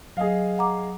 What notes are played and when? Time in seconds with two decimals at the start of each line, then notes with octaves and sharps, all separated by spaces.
0.17 F#3 G#4 D#5 F5
0.58 F#5 A#5 D6